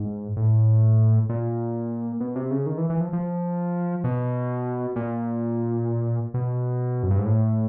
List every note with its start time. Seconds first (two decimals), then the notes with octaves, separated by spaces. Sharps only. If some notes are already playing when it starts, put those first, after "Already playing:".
Already playing: G#2
0.37 A2
1.29 A#2
2.20 B2
2.36 C3
2.51 C#3
2.66 D#3
2.78 E3
2.90 E3
3.01 F3
3.13 F3
4.04 B2
4.96 A#2
6.34 B2
7.03 F#2
7.11 G2
7.19 G#2
7.26 A2